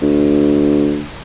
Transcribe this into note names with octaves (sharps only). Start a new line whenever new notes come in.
D2